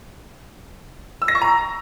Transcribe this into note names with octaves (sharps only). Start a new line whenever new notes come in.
E6
A#6
C#6
A#5